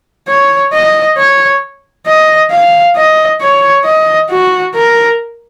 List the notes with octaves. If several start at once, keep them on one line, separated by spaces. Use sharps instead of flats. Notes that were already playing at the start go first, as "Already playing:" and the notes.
C#5
D#5
C#5
D#5
F5
D#5
C#5
D#5
F#4
A#4